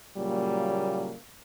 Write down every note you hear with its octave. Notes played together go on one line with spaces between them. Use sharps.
A#2 C#3 F#3 G3 A#3